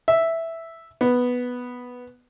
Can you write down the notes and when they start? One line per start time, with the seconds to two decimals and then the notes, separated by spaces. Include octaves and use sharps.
0.08 E5
1.01 B3